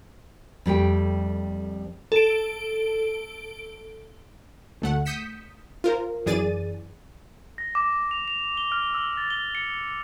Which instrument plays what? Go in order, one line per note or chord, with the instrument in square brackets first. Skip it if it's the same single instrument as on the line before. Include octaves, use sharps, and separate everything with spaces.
[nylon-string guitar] F2 G3 A3 G5
[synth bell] A4 D7
[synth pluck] D2 A3 F#5
D#6 G6 B6 C#7 E7
F4 A#4 C5
F#2 E3 G#4 D5 A6 D#7
[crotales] A#6
D6
F7
F7
G7
F6
E6
A6
G7
C#7